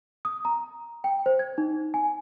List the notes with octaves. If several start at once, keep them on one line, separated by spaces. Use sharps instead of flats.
D#6
A#5
G5
C5
G#6
D#4
G#5